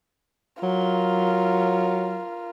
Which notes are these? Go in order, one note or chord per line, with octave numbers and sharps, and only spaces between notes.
F#3 F4 A#4